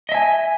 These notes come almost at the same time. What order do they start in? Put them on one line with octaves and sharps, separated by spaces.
D#5 E5 G#5